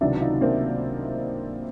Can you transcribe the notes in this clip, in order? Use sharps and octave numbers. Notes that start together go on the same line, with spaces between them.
C#2 C3 D#3 F#3 D4 E4
D#4 F4
A#3 C4